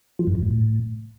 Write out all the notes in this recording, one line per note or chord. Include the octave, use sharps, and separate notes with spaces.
F3
F#2
F2
G#2
A2